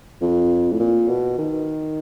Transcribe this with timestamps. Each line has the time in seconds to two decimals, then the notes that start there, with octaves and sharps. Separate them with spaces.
0.21 F2
0.72 A2
0.79 A#2
1.08 B2
1.38 D#3